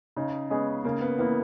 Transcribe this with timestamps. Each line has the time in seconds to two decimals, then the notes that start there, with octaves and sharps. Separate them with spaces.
0.16 C#3 D#4
0.50 G#3 B3 C#4 D#4 G#4
0.84 C#3 A#3
1.01 B3
1.18 E3 A#3 B3 E4